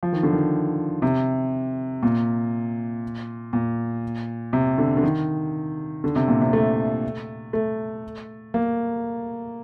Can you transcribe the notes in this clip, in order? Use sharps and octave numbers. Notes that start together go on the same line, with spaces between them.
F3
D#3
D3
D#3
C3
A#2
A#2
C3
D3
D3
D#3
D3
C3
A#2
C3
A3
A3
A#3